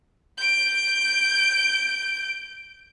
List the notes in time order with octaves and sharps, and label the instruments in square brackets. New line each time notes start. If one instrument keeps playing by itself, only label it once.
[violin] G6 D7